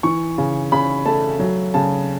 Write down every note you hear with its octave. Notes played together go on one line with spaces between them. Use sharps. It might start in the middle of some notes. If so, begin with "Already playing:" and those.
E3 C#6
C#3
C#3 B5
A3 A5
F#3
C#3 A5